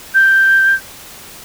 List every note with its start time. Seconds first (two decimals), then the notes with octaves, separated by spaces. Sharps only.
0.14 G6